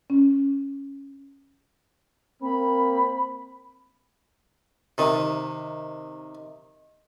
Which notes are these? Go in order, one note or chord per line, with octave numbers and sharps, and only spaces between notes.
C#4
A#3 C4 B5
C3 D#3